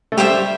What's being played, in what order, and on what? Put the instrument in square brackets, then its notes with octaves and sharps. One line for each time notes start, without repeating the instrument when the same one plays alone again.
[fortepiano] A3
[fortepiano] G3 [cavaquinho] G4 C5 E5 G5